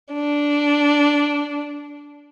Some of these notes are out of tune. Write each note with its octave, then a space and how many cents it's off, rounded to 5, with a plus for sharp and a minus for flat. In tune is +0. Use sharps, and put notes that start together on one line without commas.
D4 -10